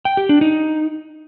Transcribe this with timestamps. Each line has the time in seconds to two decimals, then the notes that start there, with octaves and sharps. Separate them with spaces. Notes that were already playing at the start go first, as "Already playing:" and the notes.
0.05 G5
0.17 G4
0.29 D4
0.41 D#4